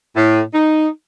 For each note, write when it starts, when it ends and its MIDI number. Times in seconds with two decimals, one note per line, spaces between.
0.16 0.42 45
0.54 0.88 63